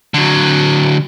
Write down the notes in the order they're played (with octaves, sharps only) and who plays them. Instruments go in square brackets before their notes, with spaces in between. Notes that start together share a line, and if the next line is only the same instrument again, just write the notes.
[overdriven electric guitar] D3 F#3